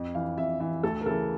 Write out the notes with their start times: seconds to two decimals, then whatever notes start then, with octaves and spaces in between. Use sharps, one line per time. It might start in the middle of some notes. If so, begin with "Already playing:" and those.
Already playing: F2
0.15 E3 F5
0.38 F2 E5
0.60 E3 E5
0.83 D2 A4
1.01 A#4
1.06 C#3 E3 A4